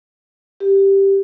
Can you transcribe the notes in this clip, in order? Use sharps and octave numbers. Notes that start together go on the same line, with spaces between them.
G4